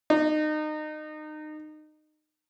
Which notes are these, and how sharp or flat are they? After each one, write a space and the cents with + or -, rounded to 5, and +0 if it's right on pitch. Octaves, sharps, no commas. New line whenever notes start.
D#4 -25